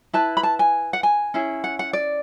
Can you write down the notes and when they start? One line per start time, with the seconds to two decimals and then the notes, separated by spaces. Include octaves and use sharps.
0.13 E4 B4 A5
0.37 B5
0.43 A5
0.59 G#5
0.93 F#5
1.03 G#5
1.34 C#4 E4 G#4
1.64 F#5
1.79 F#5
1.93 D5